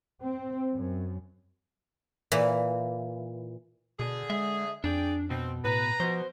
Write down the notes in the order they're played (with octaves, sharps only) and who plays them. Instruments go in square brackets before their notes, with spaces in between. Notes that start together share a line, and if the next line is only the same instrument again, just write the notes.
[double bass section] C4
F#2
[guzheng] A#2 E3
[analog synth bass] B2 [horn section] D3 G#4
[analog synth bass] G#3 [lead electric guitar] E5
[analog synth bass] F2 [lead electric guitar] D4 [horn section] G#4 D5 G5
[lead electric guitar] B2 [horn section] C4
[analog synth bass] A2 [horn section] B4 [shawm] A#5
[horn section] B2 [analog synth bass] F3 [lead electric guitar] C5